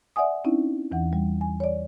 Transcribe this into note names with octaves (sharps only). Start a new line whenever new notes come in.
D5 E5 F#5 G#5 D#6
C4 C#4 D#4 E4
E2 E3 F#5
G3
G#5
C#5 D5